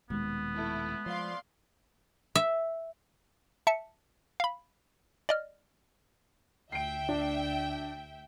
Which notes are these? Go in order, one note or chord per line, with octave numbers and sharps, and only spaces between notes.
D#1 D#2 B2 G#3 B3
A3 E4
F3 D5 F5 C6
E5
E5 A5 C#7
F5 B5
D5 D#5 F6
D2 E5 G5 C7 D7
D4